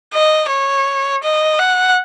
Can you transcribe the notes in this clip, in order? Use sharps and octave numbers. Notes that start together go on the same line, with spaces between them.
D#5
C#5
D#5
F#5